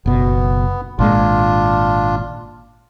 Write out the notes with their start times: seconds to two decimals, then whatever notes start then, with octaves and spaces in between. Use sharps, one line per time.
0.06 F#1 B2 B3
0.99 G#1 A#2 G#3 D4 F4